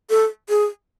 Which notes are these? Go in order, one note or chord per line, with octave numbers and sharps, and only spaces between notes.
A4
G#4